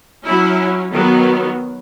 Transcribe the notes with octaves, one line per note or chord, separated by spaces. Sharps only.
F#3 C#4 E4
D#3 F#3 B3